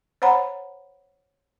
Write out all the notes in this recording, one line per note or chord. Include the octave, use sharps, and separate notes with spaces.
C5 C#5 F#5 A#5 B5